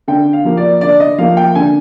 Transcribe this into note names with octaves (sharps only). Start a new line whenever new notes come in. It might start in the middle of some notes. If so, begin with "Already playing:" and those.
D3 G5
F5
F3 A#3
D5
D3 D5
D#5
F3 A#3 F5
G5
D3 G#5